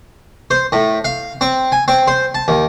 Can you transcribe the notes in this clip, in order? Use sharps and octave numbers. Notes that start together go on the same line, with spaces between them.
C5
A2
F5
C4
G#5
C4
C5
A5
D#2